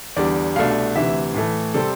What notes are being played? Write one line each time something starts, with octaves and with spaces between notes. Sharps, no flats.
E2 D3 G3 D5
C2 B2 A3 D4 F5
D2 C3 E3 E5
A2 E3 A3
C3 G3 C4 A4